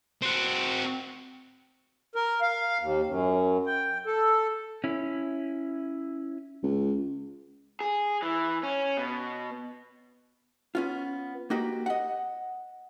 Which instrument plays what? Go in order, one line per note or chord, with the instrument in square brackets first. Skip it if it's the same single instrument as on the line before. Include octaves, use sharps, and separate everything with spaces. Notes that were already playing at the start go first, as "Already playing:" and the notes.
[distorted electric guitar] C4 F#4
[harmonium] A#4
F5
D#2
F#2
G5
A4
[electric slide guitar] C#4 E4
[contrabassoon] C#2
[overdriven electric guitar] G#4
E3
C#4
B2
[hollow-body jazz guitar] B3 C#4 F4
A#3 D#4 F#4 G4
D#5 F#5